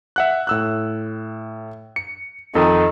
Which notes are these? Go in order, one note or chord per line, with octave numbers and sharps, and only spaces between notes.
E5 F#5 F#6
A2 E6 F#6
C#7
F2 D#3 A4 D#6